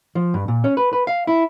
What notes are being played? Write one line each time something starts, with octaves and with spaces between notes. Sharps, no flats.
F3
G2
A#2
C#4
B4
B4
F5
E4